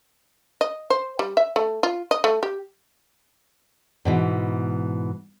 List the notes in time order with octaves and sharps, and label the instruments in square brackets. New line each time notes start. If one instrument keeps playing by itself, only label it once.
[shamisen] D#5
C5
G3
E5
A3
F4
D#5
A3
G4
[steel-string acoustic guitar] G#2 B2 E3